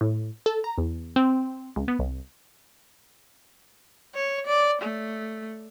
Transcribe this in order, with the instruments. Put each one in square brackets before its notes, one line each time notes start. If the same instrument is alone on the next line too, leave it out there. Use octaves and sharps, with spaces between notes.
[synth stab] A2
A4
A#5
E2
C4
C#2
B3
C2
[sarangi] C#5
D5
A3